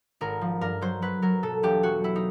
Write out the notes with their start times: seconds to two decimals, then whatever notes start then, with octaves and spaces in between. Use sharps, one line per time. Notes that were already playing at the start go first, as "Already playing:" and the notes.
0.21 G#1 A#4
0.41 F3
0.61 G2 A#4
0.81 F#3 C5
1.02 F#3 B4
1.22 F#3 A#4
1.43 B2 A4
1.63 E1 G4
1.83 F#3 F#4
2.04 F#3 E4
2.16 D#4